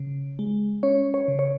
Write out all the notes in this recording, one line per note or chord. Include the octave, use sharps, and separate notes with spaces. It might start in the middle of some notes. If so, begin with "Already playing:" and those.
Already playing: C#3
G#3
C#4 C#5
C#5
C#3
C#5